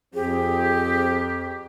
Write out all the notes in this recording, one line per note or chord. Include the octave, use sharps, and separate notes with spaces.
F2 F3 C4 G4 G#4